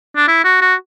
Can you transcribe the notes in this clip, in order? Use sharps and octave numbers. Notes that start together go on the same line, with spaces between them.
D4
E4
F#4
F#4